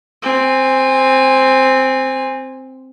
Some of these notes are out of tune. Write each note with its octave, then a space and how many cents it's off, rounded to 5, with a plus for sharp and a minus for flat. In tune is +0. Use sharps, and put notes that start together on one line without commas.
C4 +0 G#5 -25